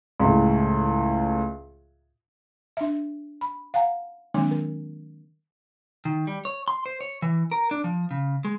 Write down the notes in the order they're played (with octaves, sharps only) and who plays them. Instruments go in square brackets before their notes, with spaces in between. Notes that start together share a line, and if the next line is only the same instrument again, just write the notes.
[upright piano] C#2 A2
[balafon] D4 E5
B5
F5 F#5 G#5 A#5
D#3 F#3 G#3 A#3 C4 D4
A#4
[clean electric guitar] D#3
G3
C#5
C6
C5
C#5
E3
A#4
D4
F3
C#3
G#3